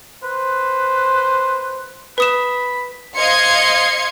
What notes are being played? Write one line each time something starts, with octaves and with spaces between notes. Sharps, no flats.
B4 C5
B4 B5 D#6 E7
C5 D#5 F5 C6 G#6 C#7